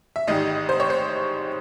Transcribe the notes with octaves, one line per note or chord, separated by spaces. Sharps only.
E5
A1 G#2 D#3 G3 D#5
C5
C#5
C5